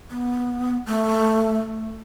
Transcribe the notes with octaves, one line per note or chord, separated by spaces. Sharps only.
B3
A3